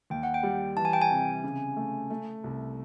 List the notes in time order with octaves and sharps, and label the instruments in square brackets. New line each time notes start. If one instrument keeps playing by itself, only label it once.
[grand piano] D#2 [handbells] G5
[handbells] F#5
G5
[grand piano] G3
[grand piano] E3 [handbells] A5
[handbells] G#5
G5
G#5
[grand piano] C3
C#3
A3
A3
C2